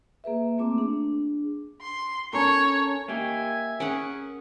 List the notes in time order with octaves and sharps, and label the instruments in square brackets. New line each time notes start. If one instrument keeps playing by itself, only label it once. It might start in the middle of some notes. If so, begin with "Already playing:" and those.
[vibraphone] A#3 G#4 B4 E5
A3 A#3 C4 F4 D6
D4 G#4
[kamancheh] C6
[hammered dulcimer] C#4 A4 A#4 [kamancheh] C#5
[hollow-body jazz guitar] A#3 G4 [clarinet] E5 [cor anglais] G#5
[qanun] C#4 G#4 F#5 [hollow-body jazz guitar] A#4